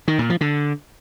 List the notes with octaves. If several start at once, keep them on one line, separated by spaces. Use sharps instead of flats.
D#3
A#2
F3
D3